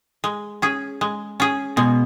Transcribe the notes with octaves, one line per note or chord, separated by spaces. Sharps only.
G#3
C#4 G#4
G#3
C#4 G#4
B2 G#3